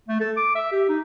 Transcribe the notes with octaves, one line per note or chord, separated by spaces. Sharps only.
A3
A4
D6
E5
G4
D#4